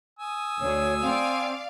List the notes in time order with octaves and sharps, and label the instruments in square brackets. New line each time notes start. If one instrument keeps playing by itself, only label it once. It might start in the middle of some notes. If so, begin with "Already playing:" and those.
[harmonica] G#5 D#6 E6
[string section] D2 [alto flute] C#5
[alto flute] C4 [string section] D5 F5